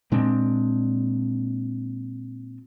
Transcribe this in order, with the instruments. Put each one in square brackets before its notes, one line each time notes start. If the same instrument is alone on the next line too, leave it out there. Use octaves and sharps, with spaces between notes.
[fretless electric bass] A#2 G#3 C4 D4